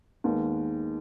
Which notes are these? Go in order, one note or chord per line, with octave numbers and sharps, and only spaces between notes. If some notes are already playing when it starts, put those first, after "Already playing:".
D#2 D#3 G#3 B3